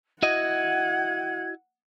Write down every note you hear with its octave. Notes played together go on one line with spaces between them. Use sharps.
E4 F#4 D#5 F#5 G#6